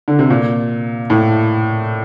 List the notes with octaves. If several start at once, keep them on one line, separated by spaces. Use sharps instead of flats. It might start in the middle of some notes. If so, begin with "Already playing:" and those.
D3
C3
A#2
A2